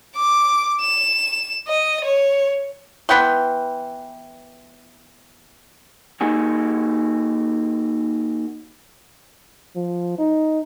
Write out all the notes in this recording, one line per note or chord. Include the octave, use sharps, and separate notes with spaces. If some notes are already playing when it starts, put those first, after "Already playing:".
D6
E7
D#5
C#5
E3 B3 G5 C6
A#3 D#4 F#4 G#4
F3
D#4